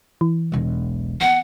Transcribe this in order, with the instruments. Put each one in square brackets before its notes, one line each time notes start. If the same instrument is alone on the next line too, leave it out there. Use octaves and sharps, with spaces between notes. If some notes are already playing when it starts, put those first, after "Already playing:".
[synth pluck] E3
[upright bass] E1 B1
[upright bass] B3 [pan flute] F#5